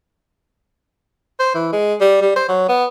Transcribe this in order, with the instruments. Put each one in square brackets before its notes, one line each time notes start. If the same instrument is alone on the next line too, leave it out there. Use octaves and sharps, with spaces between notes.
[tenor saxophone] C5
E3
G#3
G3
G3
C5
F#3
B3